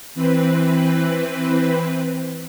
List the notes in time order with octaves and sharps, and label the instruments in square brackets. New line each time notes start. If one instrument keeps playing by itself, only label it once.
[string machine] E3 C4 B4